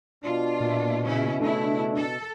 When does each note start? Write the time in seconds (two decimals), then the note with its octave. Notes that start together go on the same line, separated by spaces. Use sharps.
0.24 B2 D4 F4
0.61 A#2
1.03 C#3 C#4 E4
1.41 C#3 A3 D4 E4
1.95 A4